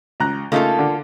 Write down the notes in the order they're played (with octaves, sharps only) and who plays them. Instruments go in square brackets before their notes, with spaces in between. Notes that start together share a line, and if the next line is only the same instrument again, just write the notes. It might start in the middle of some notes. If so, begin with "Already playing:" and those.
[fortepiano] C#2 A#5 F#6
[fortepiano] C#3 A3 D#4 [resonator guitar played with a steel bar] A#3 F4 A4
[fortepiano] D3